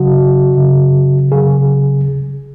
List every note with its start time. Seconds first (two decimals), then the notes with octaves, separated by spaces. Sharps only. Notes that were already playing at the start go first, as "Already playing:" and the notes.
Already playing: C#3 F#3 F#4
0.56 C#3 F#3
1.32 C#3 F#3 G#4